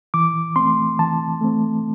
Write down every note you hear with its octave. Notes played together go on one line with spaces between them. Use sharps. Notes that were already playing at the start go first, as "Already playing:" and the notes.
E3 D6
A3 C4 C6
E3 A5
A3 C4